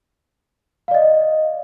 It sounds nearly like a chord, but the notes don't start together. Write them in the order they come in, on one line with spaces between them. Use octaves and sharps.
F5 D5 D#5